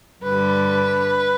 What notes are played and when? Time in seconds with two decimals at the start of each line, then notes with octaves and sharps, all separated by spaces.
0.23 G2 D3 G3 B4